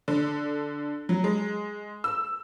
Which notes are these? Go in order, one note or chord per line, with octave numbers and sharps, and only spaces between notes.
D3
F#3
G#3
E6